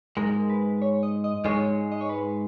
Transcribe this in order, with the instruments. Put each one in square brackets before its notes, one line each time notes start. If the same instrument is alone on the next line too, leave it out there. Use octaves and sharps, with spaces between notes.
[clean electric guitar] G#2 G#3 [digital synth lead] A#4
[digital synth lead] B4
C#5
D#5
D#5
[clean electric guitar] G#2 G#3 [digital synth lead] C#5
[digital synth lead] D#5
C#5
B4